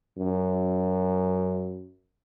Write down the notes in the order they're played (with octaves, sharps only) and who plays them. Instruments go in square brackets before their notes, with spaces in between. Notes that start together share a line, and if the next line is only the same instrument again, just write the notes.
[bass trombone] F#2